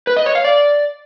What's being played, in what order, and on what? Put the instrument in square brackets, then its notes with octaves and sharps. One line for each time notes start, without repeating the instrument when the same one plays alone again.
[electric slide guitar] B4
D#5
C#5
F5
D5